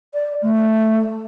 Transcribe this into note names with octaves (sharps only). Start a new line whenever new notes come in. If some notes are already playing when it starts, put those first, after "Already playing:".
D5
A3